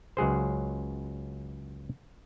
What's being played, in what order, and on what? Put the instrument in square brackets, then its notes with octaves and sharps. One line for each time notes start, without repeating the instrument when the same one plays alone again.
[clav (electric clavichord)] C#2 F#3 G#4 C5